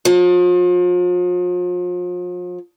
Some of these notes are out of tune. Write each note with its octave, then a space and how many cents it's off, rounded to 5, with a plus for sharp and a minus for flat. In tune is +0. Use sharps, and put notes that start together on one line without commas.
F3 +40